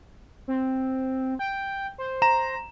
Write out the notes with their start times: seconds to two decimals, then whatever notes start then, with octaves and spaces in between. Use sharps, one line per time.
0.48 C4
1.39 G5
1.98 C5
2.22 A#5 E7